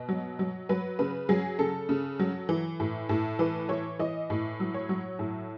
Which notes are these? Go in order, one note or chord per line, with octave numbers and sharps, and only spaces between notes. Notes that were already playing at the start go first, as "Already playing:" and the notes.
Already playing: B2 D#5
F#3
F#3
F#3 B4
C#3 B4
F#3 G#4
C#3 A4
C#3
F#3
E3
A2
A2
E3 B4
E3 C#5
E3 D#5
A2
F#3
C#5
F#3
A2